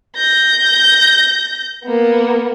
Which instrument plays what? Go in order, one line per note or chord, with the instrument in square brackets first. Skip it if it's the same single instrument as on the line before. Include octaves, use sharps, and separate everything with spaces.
[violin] G6 A#6
A#3 B3